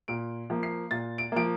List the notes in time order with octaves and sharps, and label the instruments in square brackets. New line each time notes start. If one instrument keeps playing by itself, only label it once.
[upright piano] A#2 D7
F3 A#3
C7
A#2 A6
D7
F3 A#3 D7